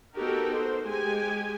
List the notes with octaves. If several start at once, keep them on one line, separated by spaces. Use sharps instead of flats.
B3 D#4 F#4 G4 A4 A#4
C5
G#3 G4 G#5